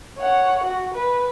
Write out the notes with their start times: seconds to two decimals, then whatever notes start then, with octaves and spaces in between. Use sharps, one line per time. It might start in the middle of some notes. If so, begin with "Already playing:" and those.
0.19 C#5 F#5
0.64 F#4
0.94 B4